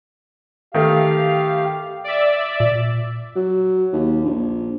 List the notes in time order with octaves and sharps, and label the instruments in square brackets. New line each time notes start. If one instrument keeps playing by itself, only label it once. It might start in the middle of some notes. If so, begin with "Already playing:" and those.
[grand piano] D#3 A3 [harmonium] G4 F5
[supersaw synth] D5 E5
[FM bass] A#2
[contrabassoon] F#3
D#2
A#1